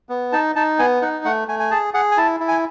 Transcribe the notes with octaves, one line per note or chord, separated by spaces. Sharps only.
B3
D#4 A5
D#4 A5
B3 G#5
D#4 F#5
A3 F#5
A3 G#5
G#5
G#4 A5
G#4 F#5
G#5
E4 A5
E4
G#5